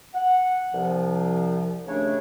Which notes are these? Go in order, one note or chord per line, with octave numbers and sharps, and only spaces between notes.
F#5
C2 F3
D#2 C#3 A3 D4 C#5